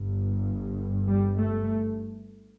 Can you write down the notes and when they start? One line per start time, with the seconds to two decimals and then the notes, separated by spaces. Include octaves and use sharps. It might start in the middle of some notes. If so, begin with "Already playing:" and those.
Already playing: G1 G2
1.07 G3
1.40 A3